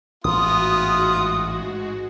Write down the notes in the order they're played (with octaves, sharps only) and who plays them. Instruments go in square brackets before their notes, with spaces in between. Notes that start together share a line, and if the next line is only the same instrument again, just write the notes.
[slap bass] A1 [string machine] G#2 G#3 F#4 [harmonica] B3 F4 [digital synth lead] D#6